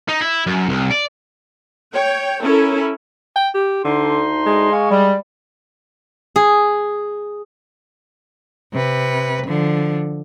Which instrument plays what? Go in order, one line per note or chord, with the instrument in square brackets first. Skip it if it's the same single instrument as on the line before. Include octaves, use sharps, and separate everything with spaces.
[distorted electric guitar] D#4
E4
F#2
C2
D5
[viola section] C#5 G5
C#4 E4 A4 A#4
[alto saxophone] G5
G4
[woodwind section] D2 D#4 C6 [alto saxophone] D3
[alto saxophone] G#3
[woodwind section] F5 G#5 C#6
G3
[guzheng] G#4
[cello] C3 B4
D3 F3